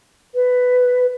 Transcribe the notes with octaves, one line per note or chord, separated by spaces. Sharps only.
B4